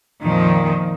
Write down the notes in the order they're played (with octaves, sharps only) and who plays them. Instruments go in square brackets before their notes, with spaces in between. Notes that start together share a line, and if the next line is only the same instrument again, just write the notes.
[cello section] F2 A#2 D#3 F3